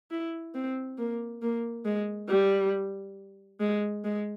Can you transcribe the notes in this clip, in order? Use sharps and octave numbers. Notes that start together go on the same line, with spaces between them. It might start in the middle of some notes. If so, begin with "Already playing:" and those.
E4
C4
A#3
A#3
G#3
G3
G#3
G#3